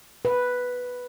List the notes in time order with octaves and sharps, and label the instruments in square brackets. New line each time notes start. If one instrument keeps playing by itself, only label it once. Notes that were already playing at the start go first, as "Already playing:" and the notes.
[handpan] B4